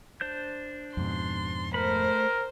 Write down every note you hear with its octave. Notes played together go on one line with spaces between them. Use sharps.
D4 C5 G6
F2 G#2 B2 C6
A3 A#4 C5 B5